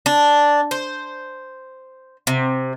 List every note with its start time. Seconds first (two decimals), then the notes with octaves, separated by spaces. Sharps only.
0.06 D4
0.71 C5
2.27 C3